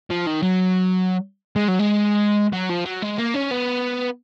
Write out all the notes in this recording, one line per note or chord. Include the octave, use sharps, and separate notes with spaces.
F3
D#3
F#3
G#3
F#3
G#3
F#3
F3
F#3
G#3
A#3
C#4
B3